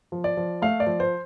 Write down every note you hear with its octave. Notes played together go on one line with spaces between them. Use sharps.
F3
D5
F3
A3 F5
D5
F3
C5